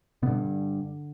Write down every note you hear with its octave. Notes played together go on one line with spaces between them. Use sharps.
G2 B2 D3 B3